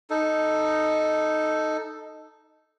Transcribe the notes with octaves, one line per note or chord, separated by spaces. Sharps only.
D#4 A4